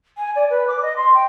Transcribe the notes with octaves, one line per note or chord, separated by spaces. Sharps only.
G#5
D5
B4
D6
D#5
C6
G5